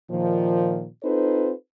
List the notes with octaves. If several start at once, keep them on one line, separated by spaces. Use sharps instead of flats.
A#2 D#3 F3
C4 D#4 F4 A4 B4 C5